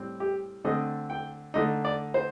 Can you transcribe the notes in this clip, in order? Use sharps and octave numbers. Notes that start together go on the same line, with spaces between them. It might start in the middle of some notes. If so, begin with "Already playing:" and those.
Already playing: A2 G3 C4
G4
D3 A3 C4 D#5
G5
D3 A3 D#4 D#5
D5
C5